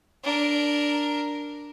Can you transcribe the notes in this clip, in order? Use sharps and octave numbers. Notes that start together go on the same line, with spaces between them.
D4 A#4